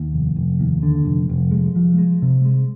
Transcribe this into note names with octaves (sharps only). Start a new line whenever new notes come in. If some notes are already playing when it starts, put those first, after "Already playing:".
Already playing: D#2
F1
F1
D#2
D3
F1
F1
G#3
F3
G#3
C3
G#3